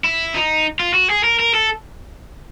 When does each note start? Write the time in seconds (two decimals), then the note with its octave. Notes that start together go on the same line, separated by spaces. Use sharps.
0.04 E4
0.34 D#4
0.80 F4
0.94 F#4
1.10 G#4
1.24 A#4
1.39 A#4
1.54 A4